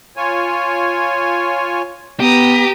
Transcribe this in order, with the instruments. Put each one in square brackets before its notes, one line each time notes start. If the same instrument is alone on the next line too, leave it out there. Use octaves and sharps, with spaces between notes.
[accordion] F4 C#5 G#5
[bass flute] B3 [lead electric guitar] G4 [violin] A#5 D#6